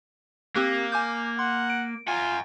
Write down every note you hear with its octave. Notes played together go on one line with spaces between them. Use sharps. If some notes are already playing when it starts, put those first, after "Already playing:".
A#3 C4 G4 F#6
G#5 D6 G6
F#5 C6
D7
F4 F#5 G#5